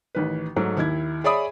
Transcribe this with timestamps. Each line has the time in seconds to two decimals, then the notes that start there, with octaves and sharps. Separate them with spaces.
0.15 A1 D#3 B4
0.56 G#2 F#3 A3
0.77 D#2 D#3 E4 G#6
1.24 G#4 C#5 D5 E5 B5 D#6